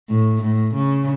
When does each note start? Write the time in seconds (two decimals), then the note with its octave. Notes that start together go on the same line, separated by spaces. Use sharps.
0.09 A2
0.42 A2
0.74 C#3